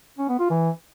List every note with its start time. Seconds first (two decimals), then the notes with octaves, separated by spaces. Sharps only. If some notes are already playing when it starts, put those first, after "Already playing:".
0.18 C#4
0.29 B3
0.40 F4
0.50 E3